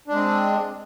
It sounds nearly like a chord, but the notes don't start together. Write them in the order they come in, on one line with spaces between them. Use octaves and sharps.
D4 G#3 C4